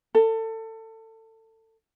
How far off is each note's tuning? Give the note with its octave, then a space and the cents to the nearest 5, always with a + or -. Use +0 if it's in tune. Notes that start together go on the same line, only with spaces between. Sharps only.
A4 +25